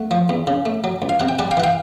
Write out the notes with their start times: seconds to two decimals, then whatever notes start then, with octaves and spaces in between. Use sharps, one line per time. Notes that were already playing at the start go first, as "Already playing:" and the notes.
Already playing: A3 F#5
0.11 F3
0.29 E2
0.47 C#3
0.66 A3
0.84 F#3
1.02 C#2
1.09 F5
1.20 C3 F#5
1.29 G5
1.39 G3 F#5 G#5
1.51 F5 G5
1.57 E3 F#5
1.64 F5 G5